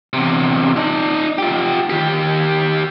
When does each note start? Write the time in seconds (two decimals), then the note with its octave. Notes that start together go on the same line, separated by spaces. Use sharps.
0.13 E2 C3
0.76 D#4 D5
1.38 F4 G4
1.90 D#3 G4